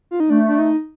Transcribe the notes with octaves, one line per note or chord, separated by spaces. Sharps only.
F4
D#4
A3 D4
D4
D#4